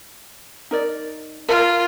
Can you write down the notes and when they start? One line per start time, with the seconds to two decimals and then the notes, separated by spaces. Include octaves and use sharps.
0.71 D#4 A#4 D5
1.48 F4 A#4